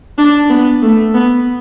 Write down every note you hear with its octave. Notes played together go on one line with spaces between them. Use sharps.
D4
B3
A3
B3